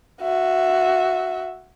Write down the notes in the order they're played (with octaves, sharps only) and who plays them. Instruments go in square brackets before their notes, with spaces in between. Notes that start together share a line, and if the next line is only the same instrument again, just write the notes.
[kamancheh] F#4 E5